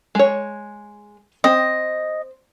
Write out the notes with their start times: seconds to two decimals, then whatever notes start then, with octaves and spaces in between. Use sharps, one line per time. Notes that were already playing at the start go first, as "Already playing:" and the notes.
0.15 G#3 C#5
1.44 C4 D#5